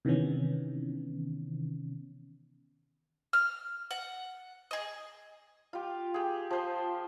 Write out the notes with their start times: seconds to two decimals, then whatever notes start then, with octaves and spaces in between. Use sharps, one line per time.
0.05 C3 D#3 E3 B3 C#4
3.33 F6
3.91 F#5
4.71 G#4 D#5
5.73 F4 G4
6.14 G4 G#4
6.51 F3 C5 C6